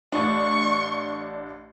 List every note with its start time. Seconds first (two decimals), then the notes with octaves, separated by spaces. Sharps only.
0.12 A1 D4 C#6